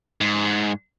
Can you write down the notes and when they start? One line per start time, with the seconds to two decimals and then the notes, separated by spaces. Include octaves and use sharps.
0.21 G#2